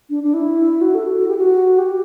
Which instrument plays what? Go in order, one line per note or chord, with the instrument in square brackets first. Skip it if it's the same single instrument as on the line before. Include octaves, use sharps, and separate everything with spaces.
[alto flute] D4
D4
E4
F#4
A4
F#4
G4
F#4
G4